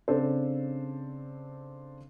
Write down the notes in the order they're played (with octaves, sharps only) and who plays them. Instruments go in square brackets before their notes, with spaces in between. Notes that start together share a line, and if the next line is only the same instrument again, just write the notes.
[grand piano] C#3 C4 D4 A4 C5